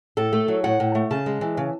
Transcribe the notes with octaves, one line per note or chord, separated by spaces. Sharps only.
A2 A4
A3
F#3
A2 F#5
A2
A3
C#3 A5
G#3
E3
C#3